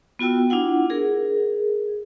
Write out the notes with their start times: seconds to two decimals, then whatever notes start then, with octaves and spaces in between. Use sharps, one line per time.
0.19 B3 F4 F#4 G5 E6
0.50 D4 E4 F4 F#5
0.90 G#4 A#4